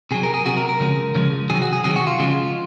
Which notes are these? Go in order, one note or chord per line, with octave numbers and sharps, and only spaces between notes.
C3 F#3 G#4
A#4
G#4
C3 F#3 F#4
A#4
A#4
C#3 F3 G#3
C#3 F3 G#3
C3 D#3 F#3 G#4
F#4
G#4
C3 D#3 F#3 G#4
F#4
F4
C#3 F3 G#3